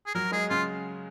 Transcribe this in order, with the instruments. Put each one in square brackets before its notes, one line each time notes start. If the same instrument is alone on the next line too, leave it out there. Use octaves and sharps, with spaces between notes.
[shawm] G#4
[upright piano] F#3 [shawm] A#4
[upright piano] G#3 [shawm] G#4
[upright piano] C#3 [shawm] F4